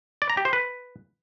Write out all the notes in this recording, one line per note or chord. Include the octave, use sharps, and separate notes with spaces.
D5
A#5
G4
C5
B4